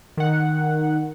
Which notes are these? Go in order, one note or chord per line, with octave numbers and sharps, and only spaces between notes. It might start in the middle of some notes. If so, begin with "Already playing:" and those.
D#3 F#5